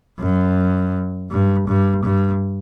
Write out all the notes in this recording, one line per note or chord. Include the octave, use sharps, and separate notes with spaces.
F#2
G2
G2
G2